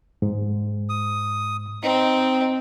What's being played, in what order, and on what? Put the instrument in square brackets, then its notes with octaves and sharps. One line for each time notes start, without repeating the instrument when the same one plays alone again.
[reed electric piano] G#2
[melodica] D#6
[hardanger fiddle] C4 [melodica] D#4